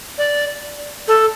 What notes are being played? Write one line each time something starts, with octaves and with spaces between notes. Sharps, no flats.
D5
A4